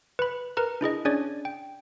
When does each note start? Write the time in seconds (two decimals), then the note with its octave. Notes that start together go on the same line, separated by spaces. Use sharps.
0.19 B4 B5
0.57 A#4 B4 A#5
0.81 D4 E4 G#4 D#5
1.05 C#4 D4 G#4 C#5 D5
1.45 G5